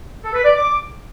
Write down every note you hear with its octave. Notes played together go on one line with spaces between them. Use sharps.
A4
B4
D5
D6